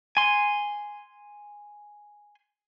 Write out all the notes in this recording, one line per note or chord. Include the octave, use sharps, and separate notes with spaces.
G#5 C6